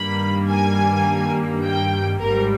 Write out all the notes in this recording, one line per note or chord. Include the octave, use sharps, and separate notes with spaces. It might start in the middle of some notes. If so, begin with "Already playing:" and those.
Already playing: G2 D#3 G3 A#3 B5
G#5
G5
G#1 G#2 G3 A#4